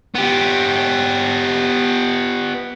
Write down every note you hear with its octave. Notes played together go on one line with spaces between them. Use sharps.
B3 G4